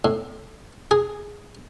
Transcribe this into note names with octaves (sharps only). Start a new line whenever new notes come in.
A2
G#4